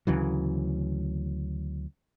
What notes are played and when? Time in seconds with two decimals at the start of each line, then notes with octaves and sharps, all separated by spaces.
0.07 D2 C#3 E3 F#3